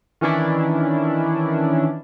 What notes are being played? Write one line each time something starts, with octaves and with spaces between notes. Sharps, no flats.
D#3 E3 C#4 D4 E4